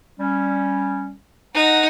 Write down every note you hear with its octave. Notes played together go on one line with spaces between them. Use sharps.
G3 C#4
D#4 F#5 A#5